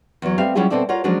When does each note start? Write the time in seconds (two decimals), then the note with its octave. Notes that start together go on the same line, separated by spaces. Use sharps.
0.22 E2 F#3
0.38 G3 A3 C4 B4 E5 F5
0.55 F#3 G3 C#4 E4 F4 G#4
0.70 B2 C4 A4 D5 E5
0.89 F4 A#4 C#5 F#5
1.04 F3 F#3 G#3 C#4 D4 F#4